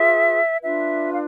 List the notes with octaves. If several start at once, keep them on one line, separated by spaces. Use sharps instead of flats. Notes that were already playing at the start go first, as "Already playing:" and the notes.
Already playing: F4 G#4 B4 E5
D4 F4 B4 E5
F5